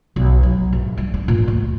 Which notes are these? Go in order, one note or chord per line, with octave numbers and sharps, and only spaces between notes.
B1
F#3
A#1
G3
D4
A#2
D2